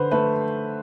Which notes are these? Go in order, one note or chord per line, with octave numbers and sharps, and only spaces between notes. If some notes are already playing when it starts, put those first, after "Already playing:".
Already playing: D3 B4 C5
A3 B4